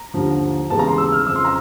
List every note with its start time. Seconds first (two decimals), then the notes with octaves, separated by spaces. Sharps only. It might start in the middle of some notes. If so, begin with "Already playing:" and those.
Already playing: A#5
0.14 D#2 D3 F3
0.70 D#2 C#3 E3 G#3 B3 A5
0.79 A#5
0.88 C6
0.98 E6
1.12 F6
1.25 F2 C#3 F3 E6
1.36 C6
1.45 A#5